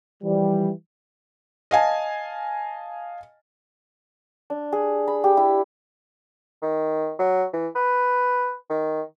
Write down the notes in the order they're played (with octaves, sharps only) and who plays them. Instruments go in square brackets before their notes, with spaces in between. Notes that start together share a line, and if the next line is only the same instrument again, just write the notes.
[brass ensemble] E3 F3 G3
[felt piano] D#5 F5 G#5 A5
[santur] D4
G#4
B5
G4
E4
[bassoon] D#3
F#3
E3
B4
D#3